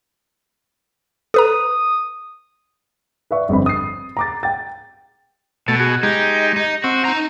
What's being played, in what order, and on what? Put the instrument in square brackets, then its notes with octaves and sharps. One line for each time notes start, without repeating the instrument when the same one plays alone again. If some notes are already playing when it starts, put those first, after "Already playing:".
[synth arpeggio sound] A4 B4 A#5 [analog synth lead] D#6
[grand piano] B4 D5 E5 C#6
G1 F2 C4 B5
D#6 C7
A#5 D6 A6
G5 A6
[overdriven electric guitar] B2 [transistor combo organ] A3 A5
[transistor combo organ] F#4 G#4
[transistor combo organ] G#3 G4 [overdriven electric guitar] D#4
[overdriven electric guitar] D#4
[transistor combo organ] C4 [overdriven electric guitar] F#4
[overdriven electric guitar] D#4 A#5